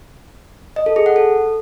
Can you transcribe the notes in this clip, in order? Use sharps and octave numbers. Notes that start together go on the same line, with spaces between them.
D#5
A4
G#4
F#5
A4